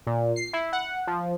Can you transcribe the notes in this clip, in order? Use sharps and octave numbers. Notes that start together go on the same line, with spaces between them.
A#2
C7
E4
F#5
F3